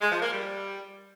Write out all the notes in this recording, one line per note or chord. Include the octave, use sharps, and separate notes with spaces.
G#3
F3
A#3
G3